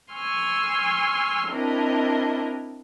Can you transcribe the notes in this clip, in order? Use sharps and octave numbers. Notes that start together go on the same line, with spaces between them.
G#5 C6 C#6 E6 F6
C4 D4 E4 A#4 D#5